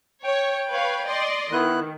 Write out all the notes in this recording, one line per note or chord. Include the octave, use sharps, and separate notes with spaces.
C#5 G5
B4 C#5 F5
D5 D#5 C6
D#3 B3 E4 F#6